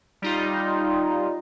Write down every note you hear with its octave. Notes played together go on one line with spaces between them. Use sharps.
G3 D#4 F4